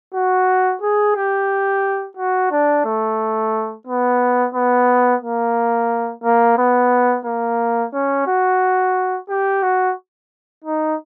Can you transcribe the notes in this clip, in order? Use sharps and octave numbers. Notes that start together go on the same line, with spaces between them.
F#4
G#4
G4
F#4
D4
A3
B3
B3
A#3
A#3
B3
A#3
C#4
F#4
G4
F#4
D#4